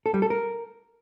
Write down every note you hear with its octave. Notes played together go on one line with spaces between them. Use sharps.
A4
G3
A4
A#4